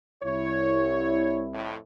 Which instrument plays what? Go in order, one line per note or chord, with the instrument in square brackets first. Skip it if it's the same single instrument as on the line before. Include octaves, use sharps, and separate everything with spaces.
[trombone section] C2 E4 [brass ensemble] C#5
[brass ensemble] F2 A2